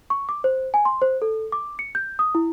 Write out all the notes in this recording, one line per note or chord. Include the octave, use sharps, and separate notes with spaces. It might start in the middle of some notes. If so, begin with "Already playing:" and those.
C#6
D6
C5
G#5
C6
C5
A4
D6
C#7
G6
D#6
E4